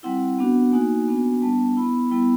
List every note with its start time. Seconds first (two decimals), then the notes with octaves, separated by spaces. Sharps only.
0.03 G3 C4 E4 F#5
0.39 B3 D4 F#4
0.72 A#3 D#4 F#4 G#5
1.08 B3 D4 F#4
1.42 G3 B3 D4 A5
1.77 B3 E4 B5
2.11 G3 B3 E4